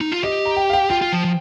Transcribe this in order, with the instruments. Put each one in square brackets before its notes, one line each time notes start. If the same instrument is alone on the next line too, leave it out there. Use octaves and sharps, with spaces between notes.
[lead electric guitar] D#4
F4
[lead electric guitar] G4 [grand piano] D#5
[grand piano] A#5
G5
F5
G5
[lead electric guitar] F4 [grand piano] G5
[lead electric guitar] F4
F3
F3